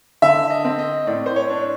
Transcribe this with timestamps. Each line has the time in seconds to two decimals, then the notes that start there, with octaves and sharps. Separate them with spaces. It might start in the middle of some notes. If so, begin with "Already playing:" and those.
0.22 D3 E5
0.50 D#5
0.65 C4
0.79 D#5
1.07 A2 D5
1.26 C5
1.36 C#5
1.50 D4